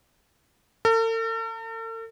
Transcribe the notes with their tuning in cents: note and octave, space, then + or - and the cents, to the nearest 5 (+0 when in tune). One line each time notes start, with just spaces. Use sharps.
A4 +45